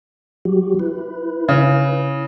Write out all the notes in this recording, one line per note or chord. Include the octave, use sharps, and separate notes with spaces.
F#3 F#4 G4
E4 B4
C#3